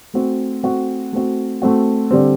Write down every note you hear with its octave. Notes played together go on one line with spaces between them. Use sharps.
A3 C4 F#4
A3 C4 F#4
A3 C4 F#4
A3 C4 F#4
D3 G3 C4